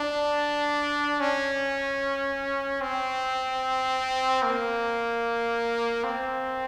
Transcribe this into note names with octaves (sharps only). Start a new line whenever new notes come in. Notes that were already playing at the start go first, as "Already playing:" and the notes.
Already playing: D4
C#4
C4
A#3
C4